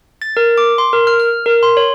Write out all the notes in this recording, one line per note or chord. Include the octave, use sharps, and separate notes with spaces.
A6
A#4
D6
C6
A#4
F6
F6
A#4
C6
C#5